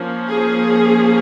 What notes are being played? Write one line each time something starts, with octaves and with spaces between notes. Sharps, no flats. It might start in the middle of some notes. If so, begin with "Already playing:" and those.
Already playing: F3 A#3 C#4
G#4